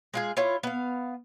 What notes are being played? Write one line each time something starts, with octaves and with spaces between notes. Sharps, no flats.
G#3 F4 G#4
E4 F4 C#5
B3 F5